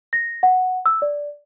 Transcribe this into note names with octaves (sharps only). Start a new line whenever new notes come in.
A#6
F#5
E6
D5